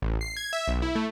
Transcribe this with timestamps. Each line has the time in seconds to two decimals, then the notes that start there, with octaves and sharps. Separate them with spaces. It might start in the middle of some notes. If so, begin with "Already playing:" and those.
0.02 A1
0.21 C7
0.37 G#6
0.53 E5
0.68 B1
0.82 E4
0.95 A3